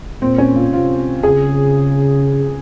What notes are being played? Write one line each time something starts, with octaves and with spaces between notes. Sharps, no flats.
A#2 C4
C#4
F4
C3 F4
C#3 G#4